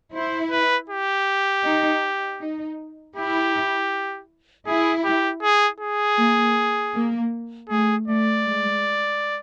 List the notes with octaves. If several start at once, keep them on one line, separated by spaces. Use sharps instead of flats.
E4 C5
B4
G4
D#4
D#4
E4 G4
E4 G#4
G4
G#4
G#4
A#3
A#3
A3 G#4
A3 D5
G#3